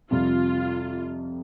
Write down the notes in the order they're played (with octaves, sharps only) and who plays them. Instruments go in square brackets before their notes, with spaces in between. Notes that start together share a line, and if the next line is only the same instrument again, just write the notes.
[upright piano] F2 C3 G3 [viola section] F4